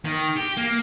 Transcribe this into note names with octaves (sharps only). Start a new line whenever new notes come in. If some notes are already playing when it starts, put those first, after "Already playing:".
D#3
G4
A#3